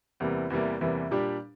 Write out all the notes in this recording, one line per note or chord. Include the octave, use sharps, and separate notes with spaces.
E2 C3 E3 G3 A#3
E2 C3 E3 G3 A#3
E2 C3 E3 G3 A#3
A#2 G3 D4 G4